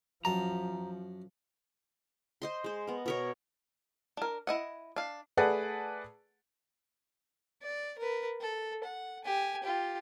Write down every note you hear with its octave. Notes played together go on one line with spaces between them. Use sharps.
F#2 F3 A5 A#5
C5 D#5 C6
G#3 C5
B3 A#4
B2 A#4 C#5
D4 A#4
E4 D#5 F#5
D4 F5
A3 G#4 B4 D5 F#5 A5
D5
A#4 B4
A4
F#5
G4 G#5
F4 G4